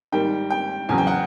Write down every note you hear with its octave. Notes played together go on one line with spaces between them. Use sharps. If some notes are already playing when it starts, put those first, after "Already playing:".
G#2 D#3 G3 A#3 G5
G5
E2 C#3 F#3 G#5
G5
F#5